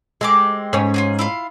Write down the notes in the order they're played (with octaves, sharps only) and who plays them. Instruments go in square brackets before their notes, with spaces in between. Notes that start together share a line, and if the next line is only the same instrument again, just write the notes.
[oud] G#3 [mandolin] C4 G4 D6
[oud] G#2 C#4
[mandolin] F4 F#4 G#4
E4 F4 F5